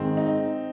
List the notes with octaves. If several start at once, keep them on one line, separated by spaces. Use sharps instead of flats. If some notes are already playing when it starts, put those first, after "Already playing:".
Already playing: G#2 D#3 G#3 C4
D#4